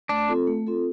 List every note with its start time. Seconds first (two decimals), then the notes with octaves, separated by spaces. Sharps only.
0.09 A3 D4
0.28 C4 F4 A4
0.47 A3
0.67 C4 F4 A4